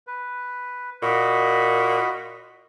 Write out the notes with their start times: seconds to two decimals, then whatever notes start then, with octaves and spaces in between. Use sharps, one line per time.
0.07 B4
1.02 A#2 F#4 D#5 B5